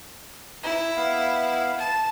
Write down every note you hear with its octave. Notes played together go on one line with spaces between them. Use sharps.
E4
B3 F5
A5